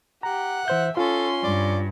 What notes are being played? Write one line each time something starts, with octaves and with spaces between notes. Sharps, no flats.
G4 F#5 A#5
E3 C5 E5 G6
C#4 F4 A4 C6
G2 D5